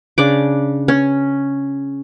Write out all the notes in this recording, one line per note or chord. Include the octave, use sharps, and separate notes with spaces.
C#3 D4 D6
C#4